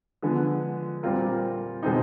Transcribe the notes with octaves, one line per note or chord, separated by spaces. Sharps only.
D3 F3 G#3 B3
A#2 G3 C4 F4 A#4
B2 G#3 C4 D#4